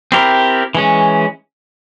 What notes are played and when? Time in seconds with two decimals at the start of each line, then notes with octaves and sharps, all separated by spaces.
0.12 C4 E4 G4 A#4
0.75 E3 G#3 C#4